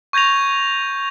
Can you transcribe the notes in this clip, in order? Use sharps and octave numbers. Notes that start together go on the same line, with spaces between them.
C#6 G6 G#6 A#6 F7